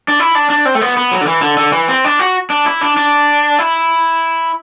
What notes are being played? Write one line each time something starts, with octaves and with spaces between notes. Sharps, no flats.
D4
E4
D4
D4
C4
A3
B3
B3
F#3
D3
E3
D3
D3
E3
C4
D4
F#4
D4
E4
D4
D4
E4